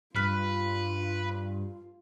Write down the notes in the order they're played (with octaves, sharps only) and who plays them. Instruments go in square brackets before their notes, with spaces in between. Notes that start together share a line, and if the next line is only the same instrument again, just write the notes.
[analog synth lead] G2 [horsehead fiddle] F4 [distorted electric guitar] B4 [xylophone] F6 F#6 B6